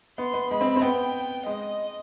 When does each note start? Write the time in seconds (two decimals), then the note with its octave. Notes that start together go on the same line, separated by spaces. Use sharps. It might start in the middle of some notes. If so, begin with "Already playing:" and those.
0.18 B3 C6
0.34 B3
0.51 G#3 B5
0.61 C4
0.76 C4
0.82 B3 G5
1.46 G#3 D#5